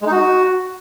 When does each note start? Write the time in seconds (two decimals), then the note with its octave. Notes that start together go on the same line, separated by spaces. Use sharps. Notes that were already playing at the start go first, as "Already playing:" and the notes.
0.02 G#3
0.07 D#4
0.12 F#4